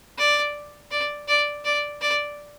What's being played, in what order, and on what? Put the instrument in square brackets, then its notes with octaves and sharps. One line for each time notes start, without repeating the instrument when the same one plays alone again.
[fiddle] D5
D5
D5
D5
D5